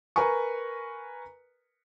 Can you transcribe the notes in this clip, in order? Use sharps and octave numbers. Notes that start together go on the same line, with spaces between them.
A#4 B4 G#5 A#5 C#6